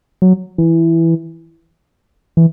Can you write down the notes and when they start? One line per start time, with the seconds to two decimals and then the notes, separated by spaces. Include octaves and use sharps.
0.22 F#3
0.58 E3
2.37 E3